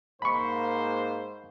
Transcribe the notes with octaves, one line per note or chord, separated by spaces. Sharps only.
G#2 A#3 C5 B5 C#6